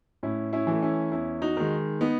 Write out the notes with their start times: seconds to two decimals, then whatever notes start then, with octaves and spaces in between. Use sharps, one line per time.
0.23 A2 C#4 E4
0.53 C#4 E4
0.67 E3 A3
0.82 C#4 E4
1.12 E2 C#4 E4
1.42 D#4 F#4
1.57 D#3 G#3
2.01 B3 D#4